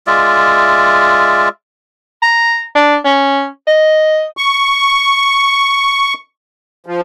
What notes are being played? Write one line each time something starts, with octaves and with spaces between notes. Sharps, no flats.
G#3 F4 D5 E5
A#5
D4
C#4
D#5
C#6
F3